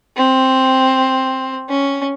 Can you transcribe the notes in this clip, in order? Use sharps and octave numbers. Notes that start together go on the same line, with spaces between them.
C4
C#4